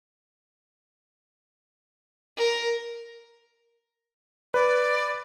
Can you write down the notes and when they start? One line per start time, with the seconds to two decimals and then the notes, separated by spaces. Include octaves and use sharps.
2.38 A#4
4.54 B4 D5